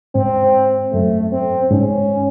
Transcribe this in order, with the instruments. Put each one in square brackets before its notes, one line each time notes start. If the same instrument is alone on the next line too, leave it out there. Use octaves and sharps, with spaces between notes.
[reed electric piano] G#2 [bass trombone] C4
[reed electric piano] F#2 [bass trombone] A3
[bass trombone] C4
[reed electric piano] G#2 [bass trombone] C#4